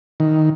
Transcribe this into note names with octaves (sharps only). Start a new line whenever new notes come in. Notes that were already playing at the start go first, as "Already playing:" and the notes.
D#3